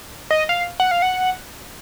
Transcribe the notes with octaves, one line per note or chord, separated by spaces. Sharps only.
D#5
F5
F#5
F5
F#5